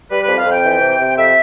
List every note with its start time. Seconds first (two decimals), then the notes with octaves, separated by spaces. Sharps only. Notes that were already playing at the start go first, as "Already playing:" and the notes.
0.09 G3 B4
0.23 B4
0.28 F2
0.37 F5
0.45 F2
0.50 G5
0.64 E3
0.80 C3
0.98 C3
1.17 F2 E5